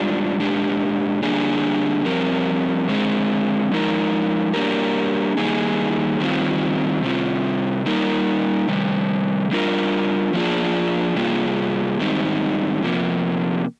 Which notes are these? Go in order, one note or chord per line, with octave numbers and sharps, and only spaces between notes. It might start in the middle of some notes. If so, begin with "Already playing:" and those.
Already playing: G#2 G3 D4 F4
A#2 G#3 D4 G4
D3 G3 A#3 D4 G#4
G2 F3 C4 G4 A#4
D3 G#3 C4
F3 G#3 D#4 A#4
G3 A#3 D4 G4 A#4
D#3 G3 A#3 D#4 G#4
D#3 G3 C4 F4
C3 G3 C4 F4
G3 A#3 D#4 A#4
C3 D#3 G3
G3 D4 F4 A#4
F3 A#3 D4 F4 G#4
C3 G3 A#3 F4 G#4
G#2 D#3 G3 C4 D#4
F2 C3 F3 A#3